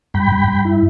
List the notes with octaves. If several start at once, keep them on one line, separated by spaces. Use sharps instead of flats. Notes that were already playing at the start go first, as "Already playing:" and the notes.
G2 G5 B5
G2
G2
E4